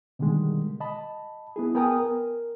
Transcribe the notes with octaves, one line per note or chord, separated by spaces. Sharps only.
B2 D3 D#3 G3 G#3
D#5 A5 B5
B3 E4 G#4
B3 A#4 G5 G#5 A#5 D#6
A#4